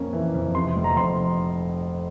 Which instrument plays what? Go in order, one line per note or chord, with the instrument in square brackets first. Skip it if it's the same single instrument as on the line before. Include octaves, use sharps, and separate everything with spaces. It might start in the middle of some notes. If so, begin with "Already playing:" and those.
Already playing: [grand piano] F2 A#3 C#4
E3
F2
C3 C6
F1
A#5
F2 C6